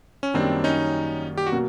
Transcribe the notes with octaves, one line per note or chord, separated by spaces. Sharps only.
C#4
F#2 D#3 G3 A#3 C4 D4
C#4 D#4
G4
F#4
B2 F#3 A#3